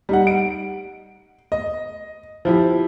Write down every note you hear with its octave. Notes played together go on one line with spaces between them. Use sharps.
G3 D#4 F#5
D7
D#5
F3 E4 G4